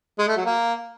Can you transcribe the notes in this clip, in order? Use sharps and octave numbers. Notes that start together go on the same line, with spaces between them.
G#3
A3
F#3
A#3